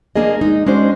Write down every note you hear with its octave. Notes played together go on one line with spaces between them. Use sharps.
F3 A#3 D4 G#4 D#5
G#3 D#4
G#3 C#4 D4 F#4 C5